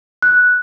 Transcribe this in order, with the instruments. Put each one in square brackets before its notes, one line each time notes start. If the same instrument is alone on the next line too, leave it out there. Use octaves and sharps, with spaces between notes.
[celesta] F#6